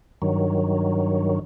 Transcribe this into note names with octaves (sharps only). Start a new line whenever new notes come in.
G2 D#3 F#3